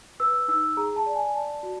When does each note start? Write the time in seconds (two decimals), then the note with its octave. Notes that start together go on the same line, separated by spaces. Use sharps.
0.20 B4 E6
0.48 D#4 E6
0.77 G#4 A#5
0.96 A5
1.06 D5
1.15 G#5
1.34 D5 A5
1.63 F#4